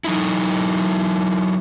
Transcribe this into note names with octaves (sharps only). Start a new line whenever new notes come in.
F#3 D#4 E4